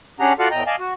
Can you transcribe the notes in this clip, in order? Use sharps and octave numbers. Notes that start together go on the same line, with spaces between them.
C#4 D4 G4 G#4 F#5 A#5
F4 F#4 A4 D5 F5 F#5
E2 A2 D#5 G5 A#5
D5 D#5 F5 G#5 A5
F#4